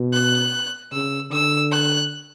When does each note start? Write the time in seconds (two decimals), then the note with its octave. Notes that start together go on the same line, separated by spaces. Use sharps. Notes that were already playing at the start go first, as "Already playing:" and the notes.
Already playing: B2
0.13 F#6
0.92 C#3 E6
1.32 D3 E6
1.72 F#6